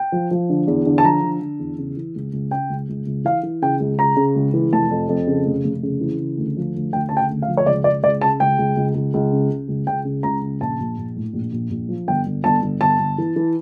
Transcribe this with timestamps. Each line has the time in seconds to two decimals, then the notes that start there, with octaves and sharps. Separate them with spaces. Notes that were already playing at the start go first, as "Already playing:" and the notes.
Already playing: G5
0.12 F3
0.31 F3
0.50 D3
0.67 E2
0.86 D3
0.98 A5
1.04 F3 A#5
1.23 D3
1.42 D3
1.59 E2
1.78 C#3
1.97 E3
2.15 C#2
2.33 C#2
2.51 C#3 G5
2.70 C#2
2.89 C#2
3.06 C#2
3.25 E3 F5
3.43 E3
3.62 C#3 G5
3.80 C#2
3.99 C#3 A#5
4.16 C#3
4.35 C#2
4.54 E3
4.72 F1 A5
4.91 F2
5.09 F2
5.27 C#3
5.46 F1
5.64 F1
5.83 C#3
6.01 E3
6.19 C#3
6.38 D2
6.57 F3
6.75 D2
6.93 D2 G5
7.09 C#3 A5
7.17 G5
7.30 D2
7.42 F5
7.48 F3
7.57 C#5
7.66 C#2 D5
7.84 C#2 D5
8.03 C#2 D5
8.21 C#3 A5
8.40 C#2 G5
8.59 C#2
8.77 C#2
8.95 C#2
9.14 C#2
9.32 C#3
9.51 C#3
9.68 C#2
9.87 C#2 G5
10.05 C#3
10.23 C#2 A#5
10.42 C#3
10.61 A#1 A5
10.79 A#1
10.98 A#1
11.16 A2
11.33 A#1
11.52 A#1
11.70 A#1
11.89 F3
12.07 G1 G5
12.26 G1
12.44 G1 A5
12.62 G1
12.80 G1 A5
12.99 G1
13.18 E3
13.36 E3